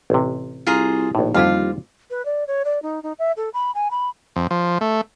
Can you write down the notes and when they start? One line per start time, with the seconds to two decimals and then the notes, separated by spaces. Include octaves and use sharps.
0.10 A1 C3
0.67 C2 F4 G#4 A#5
1.15 A#1 D#2 A2
1.34 F2 D3 G3 C4 E4 F4 F5
2.10 B4
2.25 D5
2.47 C#5
2.65 D5
2.82 D#4
3.03 D#4
3.19 E5
3.37 A4
3.54 B5
3.75 G#5
3.91 B5
4.36 F2
4.51 F3
4.81 A3